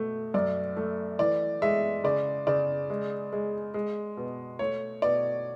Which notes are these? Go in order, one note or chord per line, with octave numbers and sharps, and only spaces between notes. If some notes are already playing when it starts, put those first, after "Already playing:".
Already playing: B2 A3
F#2 D5
A3
E3 D5
G#3 E5
C#3 D5
C#3 D5
G#3
G#3
G#3
B2
A3 C#5
B2 D5